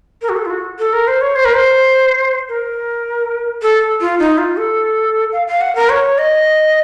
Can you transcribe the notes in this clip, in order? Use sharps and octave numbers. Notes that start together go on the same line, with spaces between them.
A#4
F#4
A4
F4
F#4
A4
A#4
C5
C#5
C5
A#4
C5
A#4
A4
F4
D#4
F4
A4
F5
F5
F#5
A#4
C#5
D#5